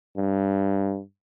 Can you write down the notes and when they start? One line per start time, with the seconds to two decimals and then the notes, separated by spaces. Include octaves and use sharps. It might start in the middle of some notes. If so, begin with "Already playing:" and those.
0.18 G2